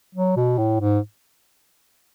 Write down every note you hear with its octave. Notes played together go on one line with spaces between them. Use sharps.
F#3
B2
A2
G#2